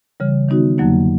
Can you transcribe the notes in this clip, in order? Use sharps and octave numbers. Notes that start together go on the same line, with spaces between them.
C#3 E3 G3
D#3 G3 B3 D#4 F#4
F2 D3 F#3 A#3 D#4